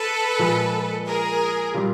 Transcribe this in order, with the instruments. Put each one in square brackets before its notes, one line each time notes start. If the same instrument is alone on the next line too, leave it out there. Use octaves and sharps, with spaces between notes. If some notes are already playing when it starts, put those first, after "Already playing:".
Already playing: [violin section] A4 B4
[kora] A#2 F3 G#3
[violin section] G#4 A#4
[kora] A#2 G3 C4 F4